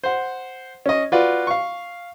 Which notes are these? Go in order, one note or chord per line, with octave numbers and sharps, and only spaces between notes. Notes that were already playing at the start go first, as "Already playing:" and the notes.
C5 F#5
C#4 D#5
F4 F#4 B4 D5
F5 C#6